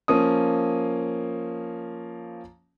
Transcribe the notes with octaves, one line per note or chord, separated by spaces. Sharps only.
F3 A#3 C#4 D#6